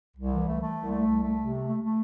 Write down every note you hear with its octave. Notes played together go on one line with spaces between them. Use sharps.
C2
E3
A3
A3
C2
A3
C2
A3
C3
A3
A3
A3